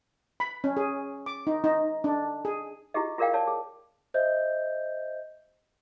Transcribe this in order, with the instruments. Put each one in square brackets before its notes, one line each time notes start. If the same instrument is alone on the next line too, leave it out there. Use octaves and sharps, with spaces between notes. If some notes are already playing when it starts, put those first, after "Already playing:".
[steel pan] B5
C#4
G#4
D6
D#4
D#4
D4
G#4
[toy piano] E4 F4 G4 G#4 D#5
F4 G#4 A#4 D5 F5 G5
C#5 D5 A5
G#4
[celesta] C5 D#5 E5 G6